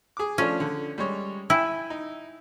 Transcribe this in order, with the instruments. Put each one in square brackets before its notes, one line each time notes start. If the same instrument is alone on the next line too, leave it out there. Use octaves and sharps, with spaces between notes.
[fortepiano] G#4 D6
[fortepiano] F3 A3 D4 [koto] C#4
[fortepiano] D3
G3 G#3 C#5
[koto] E4 [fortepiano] G5 G#5
[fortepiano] D#4